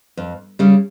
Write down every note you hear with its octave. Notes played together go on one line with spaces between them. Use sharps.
F2
C#3 G3 C#4